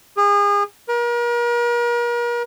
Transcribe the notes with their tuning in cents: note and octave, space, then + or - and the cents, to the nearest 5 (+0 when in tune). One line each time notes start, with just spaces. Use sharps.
G#4 -35
A#4 +40